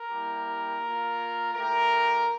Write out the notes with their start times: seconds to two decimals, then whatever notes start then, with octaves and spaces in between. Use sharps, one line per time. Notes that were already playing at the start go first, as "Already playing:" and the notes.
Already playing: A#4
0.09 G3 A#3 E4 G4
0.81 A#3 F4
1.53 A3 E4 G4 A#4